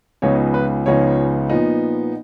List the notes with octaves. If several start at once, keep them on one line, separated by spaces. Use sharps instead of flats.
C#2 C#3 F3 B3 D#4 C#5
B4
C#2 C#3 F3 B3 D#4 C#5
A#2 F3 B3 D#4